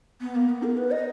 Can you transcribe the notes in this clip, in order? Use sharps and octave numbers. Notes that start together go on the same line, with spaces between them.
B3
A#3
B3
A#4
B4
D#5